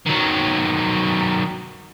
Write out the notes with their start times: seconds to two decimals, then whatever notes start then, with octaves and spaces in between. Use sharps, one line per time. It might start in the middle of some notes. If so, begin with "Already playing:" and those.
0.06 D#3 F#3